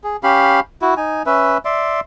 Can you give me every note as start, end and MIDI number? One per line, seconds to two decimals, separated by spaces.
0.04 0.17 68
0.23 0.60 61
0.23 0.60 67
0.23 0.60 77
0.23 0.60 83
0.82 0.94 64
0.82 0.94 66
0.97 1.23 63
0.97 1.23 80
1.26 1.58 61
1.26 1.58 71
1.26 1.58 76
1.65 2.00 74
1.65 2.00 76
1.65 2.00 84